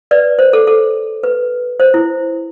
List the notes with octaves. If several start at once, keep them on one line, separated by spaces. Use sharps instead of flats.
B4 D5
C5
A4
A4
B4
C5
E4